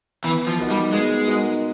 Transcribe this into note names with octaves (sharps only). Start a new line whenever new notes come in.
E3 B3
F3
D#4 F#4 A#4
G3
G#3 B3
D#4 F#4 A#4